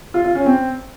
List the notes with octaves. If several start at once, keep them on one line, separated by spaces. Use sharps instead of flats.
F4
F4
C#4
C4